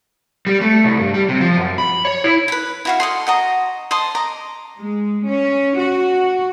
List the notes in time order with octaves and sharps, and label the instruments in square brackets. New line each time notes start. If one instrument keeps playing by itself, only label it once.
[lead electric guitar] G3
A3
C2
G2
G3
C3
F3
F#2
B5
C#5
E4
[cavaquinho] B4 B5
E4 F#4 F5
A4 D#5 C6
F#4 D#5 A#5
C5 D#5 A5 C6
D#5 A#5 D6
[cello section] G#3
C#4
F#4